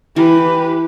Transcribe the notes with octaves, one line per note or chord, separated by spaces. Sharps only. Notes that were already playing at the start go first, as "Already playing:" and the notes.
E3 G4 B4